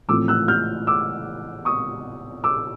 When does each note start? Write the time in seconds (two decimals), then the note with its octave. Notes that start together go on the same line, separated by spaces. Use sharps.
0.08 A1 A2 F3 A3 C4 D6 E6
0.28 E6 F#6
0.48 F6 G6
0.87 D6 E6
1.65 C#6 D#6
2.44 D6 E6